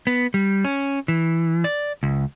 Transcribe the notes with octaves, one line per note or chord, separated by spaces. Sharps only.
B3
G3
C#4
E3
D5
C#2